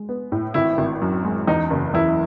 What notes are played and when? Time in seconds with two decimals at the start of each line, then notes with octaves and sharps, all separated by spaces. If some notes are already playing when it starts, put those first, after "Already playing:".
Already playing: G#3
0.09 B3
0.32 A2
0.54 G#1 E4
0.78 G#1
1.02 F#2
1.25 G#3
1.47 E2 D#4
1.70 F#1
1.94 E2 E4